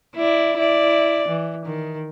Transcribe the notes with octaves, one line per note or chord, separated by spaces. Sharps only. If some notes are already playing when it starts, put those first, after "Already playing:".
E4 D5
E4 D5
E3
D#3